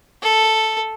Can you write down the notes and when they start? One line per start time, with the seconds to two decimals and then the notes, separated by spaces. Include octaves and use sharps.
0.22 A4